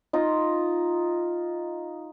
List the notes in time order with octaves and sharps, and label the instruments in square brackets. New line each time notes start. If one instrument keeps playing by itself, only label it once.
[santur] D#4 F4